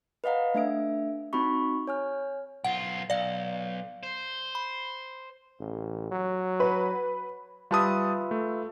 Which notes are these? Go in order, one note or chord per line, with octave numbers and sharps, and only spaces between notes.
B4 D#5 F5 F#5 A#5
A3 D4 E5 D7
C4 D#4 F#4 B5 C#6
C#5 G#5 F6
B1 F4 F#5
B1 D5 F5
C5
B5
A1
F#3
B4
G3 F4 B4 E5 A5 D#6
A3